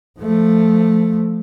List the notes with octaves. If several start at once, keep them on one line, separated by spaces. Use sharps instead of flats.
F3 A3